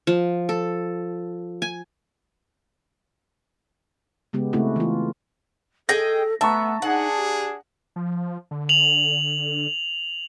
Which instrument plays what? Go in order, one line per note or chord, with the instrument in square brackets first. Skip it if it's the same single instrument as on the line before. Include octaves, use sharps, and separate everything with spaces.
[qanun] F3
A4
G#5
[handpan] C#3 G#3 B3 G4
C#3 A3 C4 E4 F#4
E3 F4
[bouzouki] G#4 D#5 G5 [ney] A4 [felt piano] A#6
[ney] A3 [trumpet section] B3 [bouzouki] E5 [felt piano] A5 A#5 C#6
[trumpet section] D4 G#4 [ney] D#4 [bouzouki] F#5
[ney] G4
[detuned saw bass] F3
D3
[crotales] F7 F#7